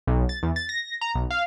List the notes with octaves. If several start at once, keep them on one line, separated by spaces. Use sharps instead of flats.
B1
A6
E2
A6
A#6
A#5
B1
F5